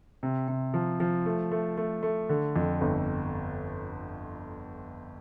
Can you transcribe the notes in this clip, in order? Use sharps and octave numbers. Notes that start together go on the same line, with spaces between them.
C3
C3
F3
F3
A3
A3
A3
A3
D3
F2
G1